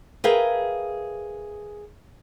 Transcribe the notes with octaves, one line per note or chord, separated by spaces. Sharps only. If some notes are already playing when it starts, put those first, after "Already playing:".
G#4 A#4 B4 E5 F5 G5